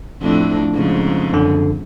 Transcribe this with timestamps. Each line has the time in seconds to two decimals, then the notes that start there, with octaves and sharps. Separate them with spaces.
0.22 F2 A2 D4
0.75 F2 G#2 C#3
1.33 F#2 D3